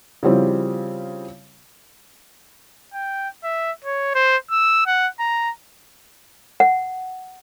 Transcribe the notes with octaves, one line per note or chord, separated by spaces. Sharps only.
C#3 F3 G3 C4 E4 F#4
G5
E5
C#5
C5
E6
F#5
A#5
F#5